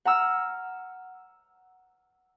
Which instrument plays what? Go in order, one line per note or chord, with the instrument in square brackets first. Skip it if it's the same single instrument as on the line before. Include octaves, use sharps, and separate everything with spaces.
[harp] F#5 A#5 E6 F6